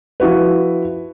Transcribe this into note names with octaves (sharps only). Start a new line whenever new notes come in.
F3 E4 F#4 B4